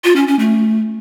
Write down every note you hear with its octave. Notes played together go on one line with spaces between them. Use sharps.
F4
C#4
C#4
A3